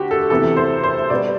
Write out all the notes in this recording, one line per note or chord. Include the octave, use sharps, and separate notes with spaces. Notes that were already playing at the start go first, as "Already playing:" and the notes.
Already playing: D2 D3 F#4 G4
A4
D2 C3 E3 B3 A4
C5
C5
B2 G3 B3 D5